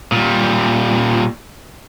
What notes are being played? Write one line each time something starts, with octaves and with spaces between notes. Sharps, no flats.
A#2 G3